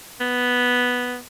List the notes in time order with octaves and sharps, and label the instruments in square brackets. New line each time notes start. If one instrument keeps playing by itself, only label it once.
[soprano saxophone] B3